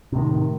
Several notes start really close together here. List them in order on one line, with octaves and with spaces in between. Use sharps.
C3 A2 D#3